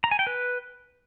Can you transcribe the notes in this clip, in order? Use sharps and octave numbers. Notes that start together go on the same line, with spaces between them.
A#5
G#5
G5
B4